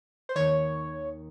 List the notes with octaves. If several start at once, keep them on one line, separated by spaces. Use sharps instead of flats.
C5
D#2 D#3 C#5